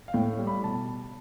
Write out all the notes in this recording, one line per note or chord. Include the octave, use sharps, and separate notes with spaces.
F5
A2 G5
G3
B5
B2 A5